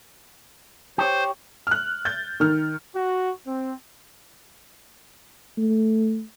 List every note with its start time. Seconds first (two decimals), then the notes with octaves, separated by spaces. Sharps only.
0.98 G4 C5 C#5
1.67 F6 F#6
2.05 G6 A6
2.40 D#3 F6
2.95 F#4
3.47 C4
5.58 A3